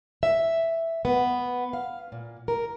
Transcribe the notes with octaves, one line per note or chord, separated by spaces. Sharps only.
E5
B3
F5
A#2
A#4